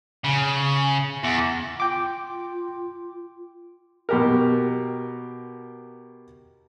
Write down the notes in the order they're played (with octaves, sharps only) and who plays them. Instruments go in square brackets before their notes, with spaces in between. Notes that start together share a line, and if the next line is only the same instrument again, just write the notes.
[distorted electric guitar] C#3
E2
[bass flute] F4 [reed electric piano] G5 D6
[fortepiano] B2 G4 A#4